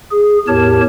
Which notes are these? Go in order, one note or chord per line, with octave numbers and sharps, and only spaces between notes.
G#4
E2 A2 G4 A#4 C#5 A5